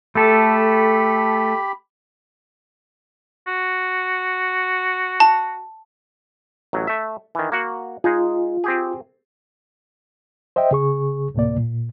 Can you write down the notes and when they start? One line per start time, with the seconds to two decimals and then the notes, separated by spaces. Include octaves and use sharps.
0.15 A3 G4 A4 B5
3.47 F#4
5.20 A5
6.73 A1 F#3
6.87 A3 E5
7.35 D#3 E3
7.52 A#3 F#4 F#5
8.04 G#3 D#4 F4 G#4
8.64 C4 G4 G#4
10.56 C5 D#5 E5 G5
10.71 C#3 G#4 C#6
11.34 D2 A2 C3 A#3 D5
11.58 A#2